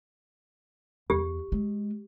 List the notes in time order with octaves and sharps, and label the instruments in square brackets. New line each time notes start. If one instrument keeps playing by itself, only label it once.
[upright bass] E2 [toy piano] G4
[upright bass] G#3